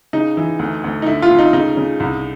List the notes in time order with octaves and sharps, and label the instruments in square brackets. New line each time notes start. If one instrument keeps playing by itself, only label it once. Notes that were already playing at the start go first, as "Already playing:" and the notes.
[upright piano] C#3 D#4
E3
D2
D2
D#4
D3 E4
F4
D2
D#4
C#3 D#4
C#3
C2